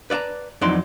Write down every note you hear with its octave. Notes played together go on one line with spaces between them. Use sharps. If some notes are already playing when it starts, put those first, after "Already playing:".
B4 D5 E5 A5 A#5
F2 E3 F#3 D#4 D5 C6